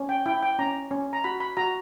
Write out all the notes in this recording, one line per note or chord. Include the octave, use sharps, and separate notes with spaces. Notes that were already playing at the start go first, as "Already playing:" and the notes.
Already playing: C#4
G5
E4 G5
G5
C#4 A#5
C#4
A#5
F#4 B5
B5
F#4 A#5